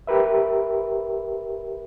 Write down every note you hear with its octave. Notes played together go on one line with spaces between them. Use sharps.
G4 A#4 B4 E5